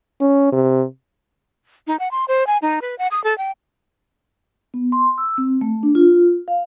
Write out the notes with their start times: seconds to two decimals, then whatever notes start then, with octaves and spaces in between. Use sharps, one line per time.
0.21 C#4
0.52 C3
1.87 D#4
2.00 F#5
2.11 C6
2.28 C5
2.47 G#5
2.62 D#4
2.82 B4
2.98 F#5
3.11 D#6
3.24 A4
3.38 G5
4.74 B3
4.92 C6
5.18 E6
5.38 C4
5.61 A3
5.83 D4
5.95 F4
6.48 F5